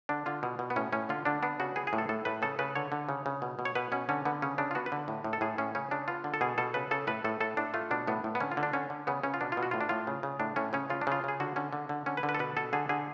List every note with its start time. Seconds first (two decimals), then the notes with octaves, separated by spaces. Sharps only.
0.09 D3 D4
0.26 D3 F4
0.43 B2
0.59 B2
0.70 B3
0.76 A2 C#4
0.92 A2 C#4
1.09 D3 F4
1.25 D3 D4
1.43 B3 D4
1.60 C#3 F#4
1.76 B3 G#4
1.87 G#4
1.93 A2
1.98 A4
2.09 A2 A4
2.25 A2 B4
2.42 C#3 A4
2.59 C#3 B4
2.75 D3 C#5
2.92 D3
3.09 C#3
3.26 C#3
3.42 B2
3.59 B2
3.65 C#5
3.75 B2 B4
3.92 B2 C#4
4.09 D3 C#4
4.25 D3 B3
4.42 C#3 C#4
4.58 C#3 D4
4.71 F4
4.75 B3 F#4
4.86 B4
4.92 D3
5.08 A2
5.24 A2
5.33 A4
5.41 A2 G#4
5.58 A2 C#4
5.75 C#3 C#4
5.91 C#3 D4
6.08 B3 F4
6.24 D3
6.34 A4
6.41 B2 G#4
6.58 B2 A4
6.74 C#3 B4
6.91 C#3 A4
7.07 A2 B4
7.24 A2 A4
7.40 A2 A4
7.57 A2 D4
7.74 A3 F4
7.91 B2 D4
8.07 A2 B3
8.24 A2
8.35 B3
8.40 D3 C#4
8.51 F4
8.57 D3
8.63 D4
8.73 D3 C#4
8.90 D3
9.07 C#3 B3
9.23 C#3 C#4
9.34 F4
9.41 B2 D4
9.52 F4
9.57 B2
9.63 F#4
9.71 A2 F4
9.81 D4
9.89 A2 F4
10.07 C#3
10.23 C#3
10.40 A2 D4
10.56 A2 C#4
10.73 C#3 C#4
10.90 C#3 F4
11.01 D4
11.07 C#3 F4
11.24 C#3 G#4
11.40 D3 F#4
11.56 D3 C#4
11.73 D3
11.89 D3
12.06 D3 C#4
12.17 B4
12.23 D3
12.29 B4
12.35 A4
12.39 B2 B4
12.57 B2 A4
12.73 D3 G#4
12.89 D3 G#4